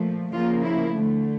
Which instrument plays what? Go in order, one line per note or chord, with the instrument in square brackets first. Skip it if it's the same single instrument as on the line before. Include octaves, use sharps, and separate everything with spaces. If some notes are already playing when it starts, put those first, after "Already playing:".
Already playing: [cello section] A#2 F3 A3
C#3 F3 A#3 F4
E4
D3 A3